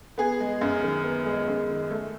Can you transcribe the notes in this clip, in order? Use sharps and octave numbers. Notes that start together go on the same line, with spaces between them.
B3 G#4
G#3
F#2
D#3
B3
G#3
F#2
D#3
A3